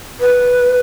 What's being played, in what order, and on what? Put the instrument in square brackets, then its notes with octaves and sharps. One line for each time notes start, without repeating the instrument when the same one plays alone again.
[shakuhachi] B4